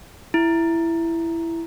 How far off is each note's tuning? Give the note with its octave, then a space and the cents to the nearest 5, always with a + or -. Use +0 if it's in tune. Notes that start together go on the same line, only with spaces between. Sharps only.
E4 +10